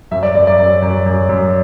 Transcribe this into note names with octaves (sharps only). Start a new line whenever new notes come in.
F#2 E5
D5
F#2 D5
D5
F#2
F#2
F#2
F#2